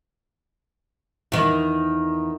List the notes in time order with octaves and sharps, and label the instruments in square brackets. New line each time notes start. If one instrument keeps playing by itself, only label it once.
[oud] E2 D#3